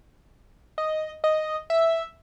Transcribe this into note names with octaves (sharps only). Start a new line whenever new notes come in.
D#5
D#5
E5